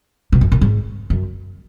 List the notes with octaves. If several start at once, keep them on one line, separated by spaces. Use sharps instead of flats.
B2
F#2
A#2
G#2
F#2